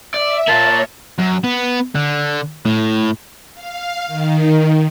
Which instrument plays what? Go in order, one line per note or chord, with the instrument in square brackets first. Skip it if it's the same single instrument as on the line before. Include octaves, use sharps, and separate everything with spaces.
[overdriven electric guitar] D5 [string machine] E5
[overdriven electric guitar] A#3 F4 [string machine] C#5 [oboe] A5
[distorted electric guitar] F#2
B3
D3
A2
[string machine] F5
D#3